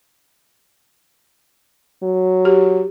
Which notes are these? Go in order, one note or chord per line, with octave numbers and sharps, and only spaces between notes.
F#3
G4